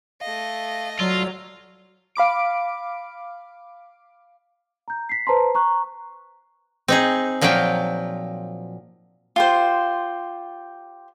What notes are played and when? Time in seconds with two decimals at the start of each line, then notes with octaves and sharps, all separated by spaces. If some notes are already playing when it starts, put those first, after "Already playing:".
0.21 A3 D#5 F5
0.99 F#3 F4 D5 E6
2.16 F5 B5 D6 D7
4.88 A#5 G6
5.09 B6 C7
5.27 B4 C5 A5 A#5 C6
5.55 A#5 C#6 F#6
6.88 C4 D#4 G#4
7.41 A#2 F3 F#3 F5 G5
9.36 F4 G4 C5